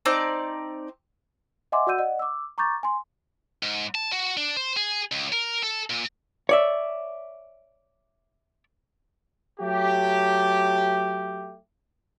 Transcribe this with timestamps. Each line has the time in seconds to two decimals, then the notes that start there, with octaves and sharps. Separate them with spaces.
0.05 C4 D#4 D5 A5
1.72 D#5 E5 F#5 G#5 C6 D6
1.87 F#4 D5 F#5 E6 G6 D#7
1.98 D5 D#5 F#5
2.19 D6 E6
2.58 A#5 C#6 D6 G6 A6
2.83 G#5 C6
3.63 G#2
3.95 A5
4.12 F#4
4.37 D4
4.57 C5
4.77 G#4
5.12 C#2
5.32 A#4
5.63 A4
5.90 A#2
6.49 C#5 D5 E5
9.60 F#3 A3 G4